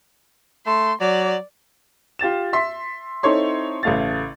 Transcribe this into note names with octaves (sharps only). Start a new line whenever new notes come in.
A3 C6
F#3 D5
F4 G4 A6 E7
E5 C6 B6
C4 D#4 E4 A4 C#5 C6
A1 C#3 A3 F5 A6